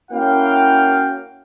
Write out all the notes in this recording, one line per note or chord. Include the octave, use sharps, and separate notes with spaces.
A#3 C#4 E4 F#4 F5 G5